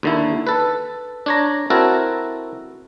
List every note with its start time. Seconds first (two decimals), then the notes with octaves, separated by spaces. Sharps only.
0.03 D#2 D3 E4
0.47 A4 B4
1.26 D4 C#5 A#5
1.70 C4 E4 F#4 A4 A#4